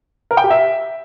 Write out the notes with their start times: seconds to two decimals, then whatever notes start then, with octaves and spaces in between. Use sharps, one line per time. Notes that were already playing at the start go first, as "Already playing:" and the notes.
0.31 A#4
0.37 G5
0.44 G4
0.51 E5